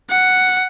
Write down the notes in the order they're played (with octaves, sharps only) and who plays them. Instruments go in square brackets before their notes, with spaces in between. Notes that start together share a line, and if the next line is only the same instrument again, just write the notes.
[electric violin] F#5